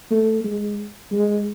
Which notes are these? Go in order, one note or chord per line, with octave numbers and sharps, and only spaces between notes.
A3
G#3
G#3